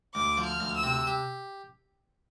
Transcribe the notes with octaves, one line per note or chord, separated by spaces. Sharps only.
D2 D6
F3
F6
D2
E6
C3
G4